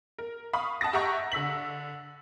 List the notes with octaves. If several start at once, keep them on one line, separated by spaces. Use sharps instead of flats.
A#4
F5 B5 C#6 D#6
F#5 A5 D#6 A6 A#6
G4 D#5 E5 F#5 A#5 C#6
D3 E6 B6 F#7